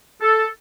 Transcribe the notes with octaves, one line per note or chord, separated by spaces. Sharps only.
A4